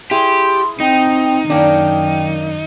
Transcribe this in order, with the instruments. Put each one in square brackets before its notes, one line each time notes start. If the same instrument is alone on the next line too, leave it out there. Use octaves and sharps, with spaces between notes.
[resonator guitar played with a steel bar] E4 G#4 [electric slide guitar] G4 [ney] C6
[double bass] C4 [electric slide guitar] D#4 [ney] G5
[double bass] F#2 D#3 [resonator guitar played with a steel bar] A#3 C#4 D4 [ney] G5